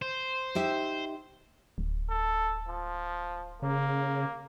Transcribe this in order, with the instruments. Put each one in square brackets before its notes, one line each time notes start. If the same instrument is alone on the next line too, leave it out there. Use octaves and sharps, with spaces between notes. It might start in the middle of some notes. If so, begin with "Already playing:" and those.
[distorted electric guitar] C5
[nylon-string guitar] D#4 G4 E5
[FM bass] D1
[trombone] A4
F3
[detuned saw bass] C#3 [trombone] A#3